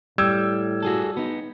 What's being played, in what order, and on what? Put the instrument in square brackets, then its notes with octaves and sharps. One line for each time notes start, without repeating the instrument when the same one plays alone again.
[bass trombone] A2 [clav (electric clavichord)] G3 [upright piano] E6 G#6
[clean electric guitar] F#4 G#4 A4
B3 D#4